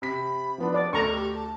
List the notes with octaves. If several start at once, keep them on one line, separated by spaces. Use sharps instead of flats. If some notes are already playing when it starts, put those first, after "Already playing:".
C3 B5 B6
F3 B3 D4
D5
D2 A4 A#5 C#6
G4
A5